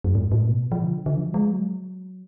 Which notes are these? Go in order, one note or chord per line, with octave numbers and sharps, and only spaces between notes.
F#2
G#2
A2
B2
F3
D3
D3
F3
F#3
G#3
F#3